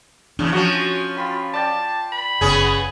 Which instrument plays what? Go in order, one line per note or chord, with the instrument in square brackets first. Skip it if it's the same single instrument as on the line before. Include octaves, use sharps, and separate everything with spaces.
[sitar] E2 C#3 [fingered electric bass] D4
[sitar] F3 C#4 [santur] F#3 F#4 F#5
[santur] F4 B5 [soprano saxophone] G5
[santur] D5 G5 [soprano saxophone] A5
[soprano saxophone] B5
[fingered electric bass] F#1 [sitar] B3 C#4 G#4 [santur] G#5